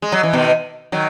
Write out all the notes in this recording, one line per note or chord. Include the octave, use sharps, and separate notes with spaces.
G#3
F#3
E3
B2 D#3
D#3 F#3